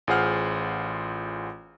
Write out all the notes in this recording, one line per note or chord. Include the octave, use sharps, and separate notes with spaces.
A1 F4 G#4 C5 F#5 F6